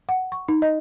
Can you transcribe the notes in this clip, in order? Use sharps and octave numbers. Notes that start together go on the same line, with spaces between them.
F#5
C#6
D#4
D#5